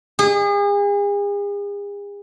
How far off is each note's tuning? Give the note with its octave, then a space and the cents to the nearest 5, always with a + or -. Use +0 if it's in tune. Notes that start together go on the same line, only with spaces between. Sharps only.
G#4 -40